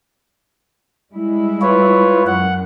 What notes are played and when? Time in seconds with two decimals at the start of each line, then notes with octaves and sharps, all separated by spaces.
1.12 G3 G#3 E4
1.62 F4 B4 C#5
2.27 F#2 F#5